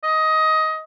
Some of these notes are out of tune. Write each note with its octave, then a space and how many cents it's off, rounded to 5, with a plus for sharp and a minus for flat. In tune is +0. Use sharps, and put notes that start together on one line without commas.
D#5 +15